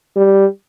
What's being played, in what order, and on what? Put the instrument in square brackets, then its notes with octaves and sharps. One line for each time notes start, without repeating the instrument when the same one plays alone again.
[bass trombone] G3